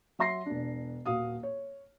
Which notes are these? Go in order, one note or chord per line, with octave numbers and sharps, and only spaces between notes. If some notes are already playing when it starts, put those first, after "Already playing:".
F#3 E5 C6 A#6 C7
E1 D4
D#1 F#4 F5 D#6
C#5